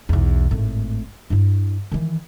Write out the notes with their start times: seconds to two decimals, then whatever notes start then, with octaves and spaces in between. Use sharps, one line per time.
0.09 B1 E2
0.51 G#1 A2
1.30 G2 E4
1.92 D#3 E3